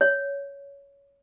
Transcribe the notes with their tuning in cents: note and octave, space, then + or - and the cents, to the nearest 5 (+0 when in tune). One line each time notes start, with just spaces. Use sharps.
C#5 +15